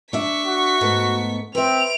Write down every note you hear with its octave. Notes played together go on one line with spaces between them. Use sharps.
D4 E5 C#6 B6
F#4
G#2 A3 B3
C4 B4 E5 D7 F7